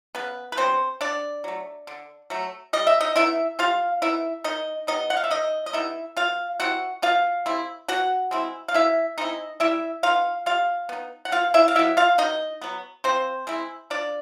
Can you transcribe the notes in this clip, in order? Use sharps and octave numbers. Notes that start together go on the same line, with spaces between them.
C#3 B3 B4
B4
F#3 B3 C4 D4 C5
D3 D4 D5
F#3 A3
D3
F#3 A3
G3 D#5
E5
D#4 D#5
B3 D#4 E4 E5
G3 F4 F5
B3 D#4 E4 E5
D#3 D#4 D#5
G3 B3 D#4 D#5
F#5
F5
E5
D#3 D#4 D#5
D#5
G3 B3 D#4 E4 E5
B2 F4 F5
G3 C4 E4 F#4 F#5
B2 F4 F5
G3 C4 E4
B2 F#4 F#5
G#3 C4 E4
F5
B2 E4 E5
G#3 C4 D#4 E4 D#5
G3 E4 E5
B3 D#4 F4 F5
G3 F4 F5
B3 D#4
F#5
B2 F4 F5
E4 E5
F5
F#3 B3 E4 E5
F4 F5
B2 D#4 D#5
F#3 B3
F3 C4 C5
G#3 C4 E4
F3 D4 D5